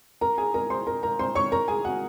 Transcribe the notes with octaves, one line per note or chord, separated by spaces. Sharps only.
A#4 A#5
G#4 G#5
A#4 A#5
C5 C6
A#4 A#5
A#4 A#5
C5 C6
C#5 C#6
A#4 A#5
G#4 G#5
F#4 F#5